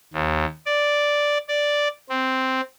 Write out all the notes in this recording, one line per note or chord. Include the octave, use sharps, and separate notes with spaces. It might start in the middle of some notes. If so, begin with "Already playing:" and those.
D#2
D5
D5
C4